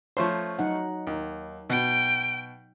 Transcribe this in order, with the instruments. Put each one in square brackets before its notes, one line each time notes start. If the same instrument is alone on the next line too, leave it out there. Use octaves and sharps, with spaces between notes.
[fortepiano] F3 A3 C5 [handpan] C#5
[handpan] F#3 D#4 F#5
[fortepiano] D#2
[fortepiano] B2 [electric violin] G5 D7